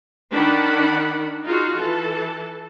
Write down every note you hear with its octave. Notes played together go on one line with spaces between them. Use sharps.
D#3 D4 F#5 B5
D#4 F4 F#4 G#4 F5
E3 A4 A5